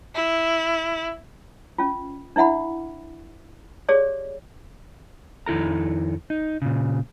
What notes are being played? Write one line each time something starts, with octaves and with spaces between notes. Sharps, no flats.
E4
C#4 F4
D4 E4 E5 F#5 B5
G4 G#4 C#5 D5
F2 D#3 E4 A4 A#5
D#4
A#2 C#3